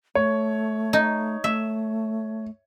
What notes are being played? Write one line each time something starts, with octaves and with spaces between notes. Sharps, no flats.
A3 C#5
D#4
A3 E5